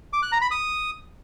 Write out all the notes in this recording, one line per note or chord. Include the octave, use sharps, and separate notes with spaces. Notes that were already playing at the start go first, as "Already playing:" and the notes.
D6
F#6
A#5
B5
D#6